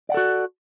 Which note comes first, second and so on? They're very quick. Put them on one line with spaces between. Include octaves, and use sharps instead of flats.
D5 F#5 A4 F#4